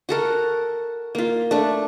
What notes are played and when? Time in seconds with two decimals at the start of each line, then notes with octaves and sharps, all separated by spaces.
0.09 F#4 A4 A#4
1.15 A#3 F4
1.51 A3 D4